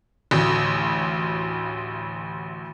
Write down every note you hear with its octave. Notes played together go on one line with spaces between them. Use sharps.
A1 D2